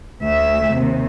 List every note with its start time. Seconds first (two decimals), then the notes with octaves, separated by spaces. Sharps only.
0.22 D2 E5
0.73 D#2 C3